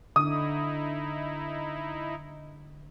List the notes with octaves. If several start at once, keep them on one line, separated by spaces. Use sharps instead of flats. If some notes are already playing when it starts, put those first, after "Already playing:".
D3 D#4 E4 D#6